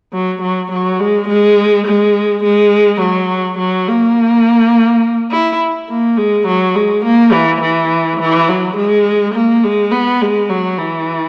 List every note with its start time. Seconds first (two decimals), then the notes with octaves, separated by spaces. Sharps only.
0.13 F#3
0.41 F#3
0.71 F#3
1.00 G#3
1.28 G#3
1.86 G#3
2.43 G#3
3.01 F#3
3.58 F#3
3.87 A#3
5.31 E4
5.89 A#3
6.17 G#3
6.47 F#3
6.75 G#3
7.05 A#3
7.33 E3
7.61 E3
8.20 E3
8.49 F#3
8.76 G#3
9.34 A#3
9.64 G#3
9.92 B3
10.21 G#3
10.49 F#3
10.78 E3